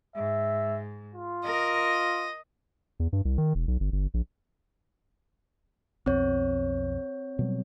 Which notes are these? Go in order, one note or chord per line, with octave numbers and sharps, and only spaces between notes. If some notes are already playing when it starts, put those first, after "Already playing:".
G#2 E5
F4
A#4 D#5
E2
G2
C2
D#3
E1
B1
G1
G1
A#1
B1 F2 C4 C#5
B2 F#3 G3